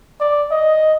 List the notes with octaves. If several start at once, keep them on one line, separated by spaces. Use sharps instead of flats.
D5
D#5